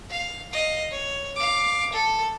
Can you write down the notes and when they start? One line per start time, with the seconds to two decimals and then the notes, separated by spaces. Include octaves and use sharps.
0.10 F5
0.52 D#5 F5
0.91 C#5
1.36 F5 D6
1.92 A4